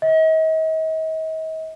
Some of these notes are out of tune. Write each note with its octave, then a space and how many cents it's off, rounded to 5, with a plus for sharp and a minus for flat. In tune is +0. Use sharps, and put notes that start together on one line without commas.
D#5 +40